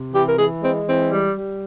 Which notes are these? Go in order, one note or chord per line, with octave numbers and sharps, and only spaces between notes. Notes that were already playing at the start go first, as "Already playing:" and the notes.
Already playing: C3
E3 G4
A#4
E3 G#4
G#3 C4
E3 C4
G3
G3